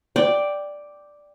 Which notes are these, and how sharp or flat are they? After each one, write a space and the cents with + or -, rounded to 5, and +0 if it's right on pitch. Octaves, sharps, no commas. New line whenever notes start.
D5 +0 G5 +0